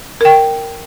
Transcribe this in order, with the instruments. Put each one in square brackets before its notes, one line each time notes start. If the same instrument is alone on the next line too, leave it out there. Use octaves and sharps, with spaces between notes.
[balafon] A#4 G5